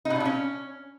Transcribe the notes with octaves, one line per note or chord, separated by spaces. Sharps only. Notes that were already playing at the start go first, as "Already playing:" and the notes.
D#4
B2
D4
A#2
C#4